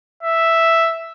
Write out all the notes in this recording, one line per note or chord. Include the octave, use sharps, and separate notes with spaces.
E5